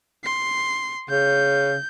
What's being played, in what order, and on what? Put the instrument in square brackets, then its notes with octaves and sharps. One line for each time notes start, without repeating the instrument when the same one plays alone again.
[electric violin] C6
[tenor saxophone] C#3 [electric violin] G6